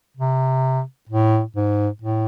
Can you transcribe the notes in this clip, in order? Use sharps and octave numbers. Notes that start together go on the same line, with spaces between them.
C3
A2
G#2
A2